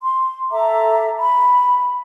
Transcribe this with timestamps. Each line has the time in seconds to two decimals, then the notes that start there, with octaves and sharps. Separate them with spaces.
0.03 C6
0.51 A4 E5 A#5 D6
1.19 B5